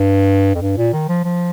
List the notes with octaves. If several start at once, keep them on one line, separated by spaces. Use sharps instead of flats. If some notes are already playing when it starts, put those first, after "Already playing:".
Already playing: G2
F2
G2
A#2
D#3
F3
F3